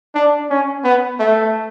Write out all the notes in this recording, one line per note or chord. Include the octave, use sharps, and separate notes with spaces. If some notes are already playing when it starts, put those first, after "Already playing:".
D4
C#4
B3
A3